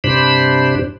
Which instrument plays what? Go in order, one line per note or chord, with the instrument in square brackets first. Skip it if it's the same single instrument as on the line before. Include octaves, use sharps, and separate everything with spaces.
[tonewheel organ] G2 C3 D4 C5 B5